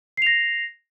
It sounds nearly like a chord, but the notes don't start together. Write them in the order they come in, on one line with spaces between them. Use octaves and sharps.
C7 F7 A#6